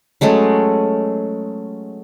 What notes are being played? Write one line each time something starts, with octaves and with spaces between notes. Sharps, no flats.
F#3 G#3 A3 C#4